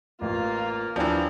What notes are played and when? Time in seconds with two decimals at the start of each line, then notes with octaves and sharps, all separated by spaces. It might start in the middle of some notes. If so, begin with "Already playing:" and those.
0.21 A1 A#3 F4
0.96 D#2 E3 F3 A#3 D4 G#5